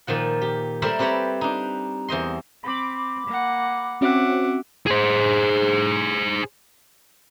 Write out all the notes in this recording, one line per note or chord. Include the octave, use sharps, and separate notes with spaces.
A#2 D#3 F3 F#5
G4
G3 A3 A#4 C5 D5 E5
C4 G4 B4 C#5 D5 A#5
D4 D#4
E2 C5 D#5 C6
C4 B5 D6
A#3 F#5
C4 C#4 F#4 E5 F#5 D6
G#4 C5